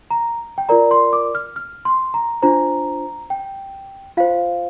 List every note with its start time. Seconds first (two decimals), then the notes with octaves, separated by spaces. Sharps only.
0.11 A#5
0.58 G5
0.69 F4 A#4 D5 A#5
0.91 C6
1.13 D6
1.35 F6
1.56 F6
1.85 C6
2.14 A#5
2.42 D4 F4 C5 A#5
3.30 G5
4.17 F4 C5 F5